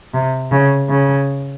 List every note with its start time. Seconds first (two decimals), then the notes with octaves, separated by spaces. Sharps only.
0.14 C3
0.52 C#3
0.90 C#3